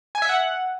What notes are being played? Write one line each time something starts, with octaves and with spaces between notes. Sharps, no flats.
G#5
E5
F#5